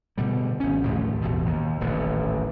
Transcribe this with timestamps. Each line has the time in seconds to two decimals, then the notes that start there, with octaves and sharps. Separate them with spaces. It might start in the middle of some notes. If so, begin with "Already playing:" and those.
0.18 B2 D3 G3
0.60 G#1 C#4
0.83 A#1 D#2 A2 A3
1.22 A1 E2 B2
1.46 D#2
1.80 D#1 A1 D3